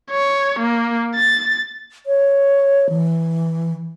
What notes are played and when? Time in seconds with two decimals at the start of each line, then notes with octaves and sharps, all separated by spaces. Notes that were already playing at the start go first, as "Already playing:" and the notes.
0.11 C#5
0.59 A#3
1.15 A6
2.06 C#5
2.89 E3